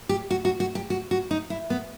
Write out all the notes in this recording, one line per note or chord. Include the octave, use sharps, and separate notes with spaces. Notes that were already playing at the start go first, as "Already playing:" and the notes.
G4
F#4
F#4
F#4
G4
F#4
F#4
D#4
E4
B3